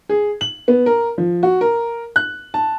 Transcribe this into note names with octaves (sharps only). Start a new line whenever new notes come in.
G#4
F#7
B3
A#4
F3
F#4
A#4
F#6
A5